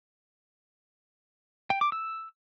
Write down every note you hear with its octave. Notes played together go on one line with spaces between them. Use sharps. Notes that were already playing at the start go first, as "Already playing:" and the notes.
G5
D6
E6